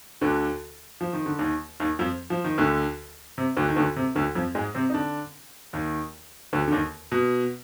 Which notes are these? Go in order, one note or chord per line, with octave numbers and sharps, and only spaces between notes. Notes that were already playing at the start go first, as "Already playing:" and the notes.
D2 D3
F3
D#3
D3
D#2 D#3
D#2 D#3
F2 F3
F3
D#3
D2 D3
C3
D2 D3
D#3
D2 D3
C3
D2 D3
F2 F3
G#2 G#3
C3 C4
D#4
D3 D4
D#2 D#3
D2 D3
D3
D#2 D#3
B2